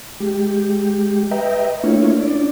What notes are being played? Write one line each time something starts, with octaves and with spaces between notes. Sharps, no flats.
G#3 G4
B4 D#5 E5 G5 A#5
A3 A#3 D4 E4 F4 C#5
C#4 D4 D5